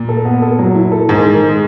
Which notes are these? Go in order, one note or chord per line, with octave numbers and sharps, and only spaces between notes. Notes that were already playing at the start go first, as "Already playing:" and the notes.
Already playing: A#2
A4
B3
A4
F#3
E4
A4
G#2 D#3
D#3
G#3